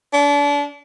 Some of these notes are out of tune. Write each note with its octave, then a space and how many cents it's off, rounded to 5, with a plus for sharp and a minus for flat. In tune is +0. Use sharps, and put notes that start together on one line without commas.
D4 -35